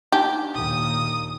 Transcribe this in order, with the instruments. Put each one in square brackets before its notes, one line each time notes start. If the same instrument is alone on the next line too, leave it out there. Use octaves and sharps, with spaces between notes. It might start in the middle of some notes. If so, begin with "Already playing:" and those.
[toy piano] D4 D#4 [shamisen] G4
[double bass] D#2 A#2 [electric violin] D#6